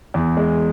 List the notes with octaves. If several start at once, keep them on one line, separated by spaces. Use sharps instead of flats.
E2
G#3